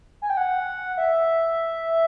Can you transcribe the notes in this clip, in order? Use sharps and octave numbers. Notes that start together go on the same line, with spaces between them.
G#5
G5
F#5
E5